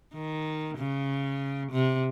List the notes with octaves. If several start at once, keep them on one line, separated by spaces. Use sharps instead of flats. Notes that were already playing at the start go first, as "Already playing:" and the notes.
D#3
C#3
C3